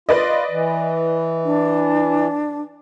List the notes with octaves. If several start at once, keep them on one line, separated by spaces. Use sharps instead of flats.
F4 B4 D5 D#5
E3
D4